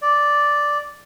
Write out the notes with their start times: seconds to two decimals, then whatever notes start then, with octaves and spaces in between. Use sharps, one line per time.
0.02 D5